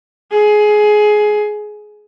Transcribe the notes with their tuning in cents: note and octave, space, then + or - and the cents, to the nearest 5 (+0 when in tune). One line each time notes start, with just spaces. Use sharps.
G#4 +20